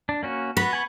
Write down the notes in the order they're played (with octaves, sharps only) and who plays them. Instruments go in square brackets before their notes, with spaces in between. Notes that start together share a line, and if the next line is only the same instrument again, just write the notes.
[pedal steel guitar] D4
A#3 C#4 F#4
[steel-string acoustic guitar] B3 [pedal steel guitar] F#4 B5
[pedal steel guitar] G#5 B5 C#6